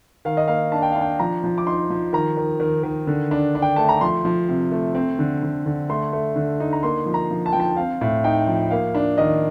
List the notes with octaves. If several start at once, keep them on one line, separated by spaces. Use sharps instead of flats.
D#3 F5
D#5
A#3 F5
D4 A5
G5
D4 F5
G5
F3 A#5
F3
D6
D#4 C6
F3
D#3 A#5
D#3
D#3
D#3
D3
D4
D4
G5
A3 A5
A#5
F3 C6
F3
C3
A3
C4
D3
D3
D3
A3 C6
A3
D3
D#4
A#5
A#3 C6
F3
A#5
F3
A5
F3 G5
A5
C4 F5
A2
D#4 G5
F3
A#3 F5
D4
D#3 D#5